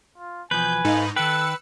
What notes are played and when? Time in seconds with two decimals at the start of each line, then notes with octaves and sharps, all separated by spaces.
0.18 F4
0.51 E2 B2 F3 B4 G#5 G6
0.84 G#2 D#4 A4 F5
1.16 D#3 A4 B4 G5 E6 F#6 C#7